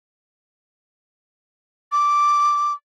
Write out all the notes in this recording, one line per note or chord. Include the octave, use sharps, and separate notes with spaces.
D6